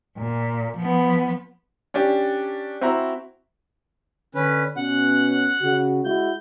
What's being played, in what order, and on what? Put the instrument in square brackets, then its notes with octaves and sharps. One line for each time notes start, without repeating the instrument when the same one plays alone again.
[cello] A#2
F3 B3
[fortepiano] C#4 D4 G4
C4 E4 F#4 E5 A#5
[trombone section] D3 [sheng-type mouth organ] C#4 B4
[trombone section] B2 C#4 [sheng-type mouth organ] F#5 F#6
[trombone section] C#3 F#4
[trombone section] G#3 E4 F#4 [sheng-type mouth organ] G6